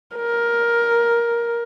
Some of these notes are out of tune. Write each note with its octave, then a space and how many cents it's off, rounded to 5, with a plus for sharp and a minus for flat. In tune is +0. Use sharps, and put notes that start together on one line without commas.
A#4 +10